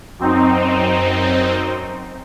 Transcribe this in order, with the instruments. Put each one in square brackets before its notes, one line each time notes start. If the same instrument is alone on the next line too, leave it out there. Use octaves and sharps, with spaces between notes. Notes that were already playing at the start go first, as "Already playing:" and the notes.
[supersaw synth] F#2 C4 D#4